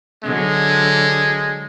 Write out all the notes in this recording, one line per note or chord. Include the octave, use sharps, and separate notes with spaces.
D3 F#3 G#3